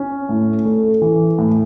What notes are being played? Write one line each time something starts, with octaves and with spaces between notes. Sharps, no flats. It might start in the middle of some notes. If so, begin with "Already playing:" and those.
Already playing: C#4
A2
A3
E3
A2